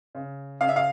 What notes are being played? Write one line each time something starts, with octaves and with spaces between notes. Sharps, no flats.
C#3
C#3 F5
E5
F5